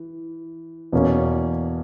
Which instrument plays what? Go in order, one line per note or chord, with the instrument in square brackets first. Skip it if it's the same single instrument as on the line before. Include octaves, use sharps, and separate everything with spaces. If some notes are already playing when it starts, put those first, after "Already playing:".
Already playing: [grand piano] E3
E2 B2 A#3 C#4